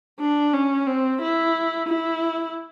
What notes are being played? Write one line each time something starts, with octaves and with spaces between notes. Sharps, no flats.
D4
C#4
C4
E4
E4